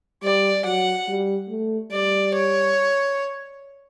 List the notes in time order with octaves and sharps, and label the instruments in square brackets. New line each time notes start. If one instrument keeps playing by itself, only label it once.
[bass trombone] G3 [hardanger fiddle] D5
[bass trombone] F#3 [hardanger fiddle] F#5
[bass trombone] G3
A3
[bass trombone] G3 [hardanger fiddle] D5
[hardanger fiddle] C#5